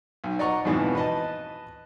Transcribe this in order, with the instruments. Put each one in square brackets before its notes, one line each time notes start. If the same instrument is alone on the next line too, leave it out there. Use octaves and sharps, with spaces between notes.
[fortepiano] B1
D5 D#5 F#5 A#5 C#6
F2 G#2 B2 E3 F3
B4 D#5 A5